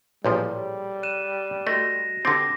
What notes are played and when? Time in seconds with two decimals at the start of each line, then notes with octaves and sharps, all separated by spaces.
0.25 A1 A#2 F3 G3 G#4 A4 C#5
1.03 F#6 D#7 E7
1.67 A3 F#4 D#5 A#6
2.25 D3 C4 G4 D6 A6 A#6